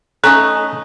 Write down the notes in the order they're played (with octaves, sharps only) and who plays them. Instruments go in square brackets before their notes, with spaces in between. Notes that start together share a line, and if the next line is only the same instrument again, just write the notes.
[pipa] A3 C#4 D#4 [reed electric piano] A#5 F#6